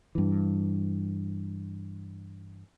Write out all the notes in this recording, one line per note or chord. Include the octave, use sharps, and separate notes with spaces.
G2 E3